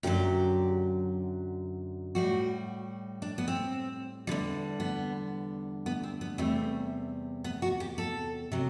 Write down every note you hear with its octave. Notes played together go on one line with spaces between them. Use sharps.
F#2 D3 F#3 G4
A2 G3 F#4
D4
B3
C4
E2 D3 G3
B3
B3
C4
B3
E2 C3 G3 A3
B3
F#4
G4
A4
C3 F#3